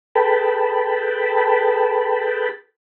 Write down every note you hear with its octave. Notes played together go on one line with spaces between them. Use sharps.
G#4 A4 B4 G5 A5 B5